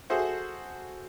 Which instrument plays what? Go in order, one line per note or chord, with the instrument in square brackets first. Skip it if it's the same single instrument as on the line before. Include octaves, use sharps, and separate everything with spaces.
[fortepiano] F#4 G#4 A4 C5 E5